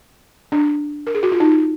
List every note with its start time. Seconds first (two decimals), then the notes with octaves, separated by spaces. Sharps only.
0.52 D4
1.07 A#4
1.15 G#4
1.23 F#4
1.32 F4
1.40 D#4